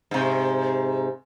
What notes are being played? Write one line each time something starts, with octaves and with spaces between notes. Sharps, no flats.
G#2 C3